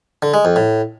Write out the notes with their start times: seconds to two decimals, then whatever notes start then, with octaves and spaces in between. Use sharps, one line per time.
0.22 D3
0.34 G#3
0.45 F2
0.56 A2